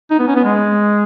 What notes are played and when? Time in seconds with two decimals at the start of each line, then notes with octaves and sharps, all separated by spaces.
0.11 D#4
0.19 B3
0.28 C#4
0.36 B3
0.45 G#3